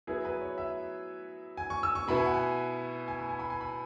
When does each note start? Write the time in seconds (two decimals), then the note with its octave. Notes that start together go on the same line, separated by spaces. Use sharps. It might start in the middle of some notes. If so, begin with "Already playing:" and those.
0.07 F#3 B3 E4 G#4
0.25 B4
0.41 C#5
0.58 E5
1.57 G#5
1.70 C#6
1.83 E6
1.95 C#6
2.08 B2 B3 E4 B5
2.17 G#5
2.25 F#5
2.34 G#5
3.08 G#5
3.19 B5
3.29 G#5
3.39 B5
3.50 G#5
3.61 B5